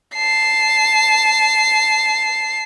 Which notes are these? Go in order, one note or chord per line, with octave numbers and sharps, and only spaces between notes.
A5 C7